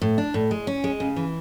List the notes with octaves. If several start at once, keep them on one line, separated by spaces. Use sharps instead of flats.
A2
D4
A2
G#3
C#4
G#3
C#3
E3